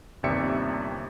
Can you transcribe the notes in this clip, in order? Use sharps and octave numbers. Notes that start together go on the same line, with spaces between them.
G1 D#2 C3 D5 E5 C#7